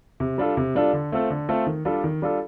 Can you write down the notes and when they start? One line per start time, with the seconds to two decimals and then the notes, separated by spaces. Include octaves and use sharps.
0.20 C3
0.38 G3 D4 F4 A4
0.57 C3
0.75 G3 D4 F4 A4
0.93 D3
1.12 A3 C4 F4 A4
1.30 D3
1.49 A3 C4 F4 A4
1.67 D#3
1.85 G3 D4 F4 A4
2.04 D#3
2.22 G3 D4 F4 A4